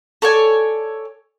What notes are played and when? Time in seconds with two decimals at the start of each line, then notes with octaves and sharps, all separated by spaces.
0.22 A4 C#5 D5 G#5